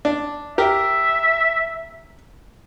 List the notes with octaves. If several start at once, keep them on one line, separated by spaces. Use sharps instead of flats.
D4
G4 A#4 E5